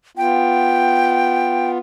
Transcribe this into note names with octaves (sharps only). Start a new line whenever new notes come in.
B3 F4 G5